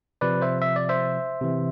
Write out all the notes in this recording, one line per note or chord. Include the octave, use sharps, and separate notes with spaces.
C3 F3 B4 D5
C5 E5
E5
D5
C5 E5
C3 E3